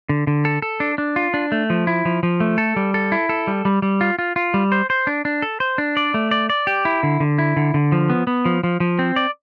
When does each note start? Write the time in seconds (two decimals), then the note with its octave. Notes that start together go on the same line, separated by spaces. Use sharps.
0.09 D3
0.27 D3
0.45 A4
0.62 A4
0.80 D4
0.98 D4
1.16 F4
1.34 D4
1.52 A3
1.70 F3
1.87 E4
2.05 F3
2.23 F3
2.40 A3
2.58 A4
2.76 G3
2.94 A4
3.12 E4
3.29 A4
3.47 G3
3.65 G3
3.82 G3
4.01 F4
4.19 F4
4.36 F4
4.54 G3
4.72 C5
4.90 C5
5.07 D4
5.25 D4
5.42 A4
5.60 C5
5.78 D4
5.97 D5
6.14 A3
6.31 D5
6.50 D5
6.67 G4
6.85 E4
7.03 D3
7.20 D3
7.38 E4
7.57 D3
7.74 D3
7.92 F3
8.10 B3
8.27 B3
8.45 F3
8.64 F3
8.80 F3
8.99 C4
9.16 D5